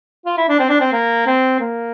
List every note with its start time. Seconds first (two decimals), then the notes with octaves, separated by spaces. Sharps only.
0.26 F4
0.37 E4
0.49 D4
0.60 C4
0.69 D4
0.80 C4
0.92 A#3
1.26 C4
1.60 A#3